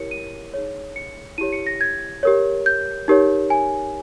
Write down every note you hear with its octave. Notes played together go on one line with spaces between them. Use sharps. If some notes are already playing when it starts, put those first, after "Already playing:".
Already playing: E4 G4 A#4 C#5 C#7
D#7
D#4 G#4 C#5
C#7
E4 G4 C#5 D#7
C#7
A#6
G#6
G4 A#4 C#5
G6
D#4 G4 A#4 C#5
G#5